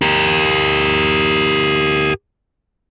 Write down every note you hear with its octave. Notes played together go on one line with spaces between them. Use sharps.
G4 A#4